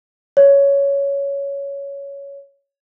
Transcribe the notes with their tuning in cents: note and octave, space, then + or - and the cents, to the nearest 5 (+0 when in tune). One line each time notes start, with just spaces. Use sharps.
C#5 +10